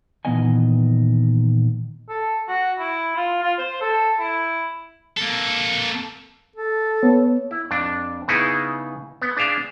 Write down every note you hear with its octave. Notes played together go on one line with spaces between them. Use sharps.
A#2 D#3 E3 B3 D#5 G#5
A4
F#4
E4
F4
F4
C5
A4
E4
A#3 A4
A4
B3 C#5
E4
F2 D4
C#3 B3 D#4 E4 G#4
B3
D4 G#4 E5 F5 G5